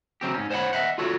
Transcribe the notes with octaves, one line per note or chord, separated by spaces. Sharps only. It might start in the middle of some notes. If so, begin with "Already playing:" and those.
C#3 F#3 C4 G4
G#2 C#4
C5 C#5 D#5 F#5 B5
D#5 E5 F#5
F4 F#4 A4 C#5